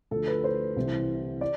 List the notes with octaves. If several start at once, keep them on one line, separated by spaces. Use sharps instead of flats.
D2 D3 F3 A4
B4
C5
C2 C3 E3
D5